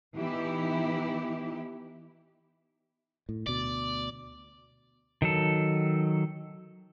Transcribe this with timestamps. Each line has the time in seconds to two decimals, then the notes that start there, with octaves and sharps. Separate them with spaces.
0.16 E3 B3 D#4 E4 G4
3.29 A2
3.46 D2 B2 D5
5.22 D#3 F#3 A4